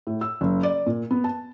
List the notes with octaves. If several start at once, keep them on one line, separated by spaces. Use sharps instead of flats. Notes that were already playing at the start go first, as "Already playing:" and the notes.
A2
E6
F#1
D5
A#2
B3
A5